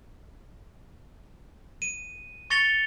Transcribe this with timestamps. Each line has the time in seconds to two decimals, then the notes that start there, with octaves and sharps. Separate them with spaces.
1.82 D#7
2.50 C#6 A6 A#6 C#7 F7 G7